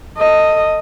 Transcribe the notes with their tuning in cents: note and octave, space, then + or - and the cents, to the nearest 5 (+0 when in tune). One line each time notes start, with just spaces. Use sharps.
A4 +25 D#5 +0